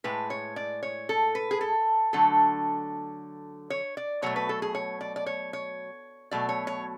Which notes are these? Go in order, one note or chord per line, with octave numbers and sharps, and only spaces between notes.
A2 G#3 B4
C#5
D5
C#5
A4
B4
G#4
A4
D3 F#3 A3 A4
C#5
D5
B2 F#3 A3 C#5
B4
A4
G#4
C#5
D5
D5
C#5
C#5
B2 F#3 A3 D5
C#5
C#5